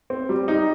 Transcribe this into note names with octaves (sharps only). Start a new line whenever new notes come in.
C4
G3
D#4